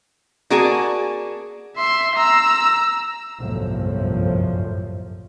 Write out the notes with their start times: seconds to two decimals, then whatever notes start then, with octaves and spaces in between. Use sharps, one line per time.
0.50 A#3 F#4 G#4 D5 G#5 A5
1.76 E5 C6
2.16 A#5 E6
3.39 G1 C2 F#2 A2 F3